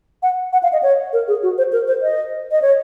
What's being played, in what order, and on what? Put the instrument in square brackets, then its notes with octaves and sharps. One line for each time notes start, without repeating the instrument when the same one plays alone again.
[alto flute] F#5
F#5
F5
D#5
C#5
A#4
G#4
F#4
C5
A#4
C5
D#5
D#5
C#5